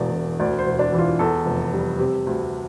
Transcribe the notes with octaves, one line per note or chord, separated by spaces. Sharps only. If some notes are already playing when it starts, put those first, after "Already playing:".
Already playing: E1 E2 D5
E1
D2 D5
C5
E1
D4
E3
F4
E2 A4
F1
G3
C3
D2